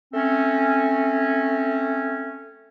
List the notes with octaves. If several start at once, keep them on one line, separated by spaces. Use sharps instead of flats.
A3 C4 C#4